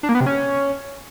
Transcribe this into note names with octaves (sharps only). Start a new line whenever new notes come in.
D4
A#3
B3
C3
C#4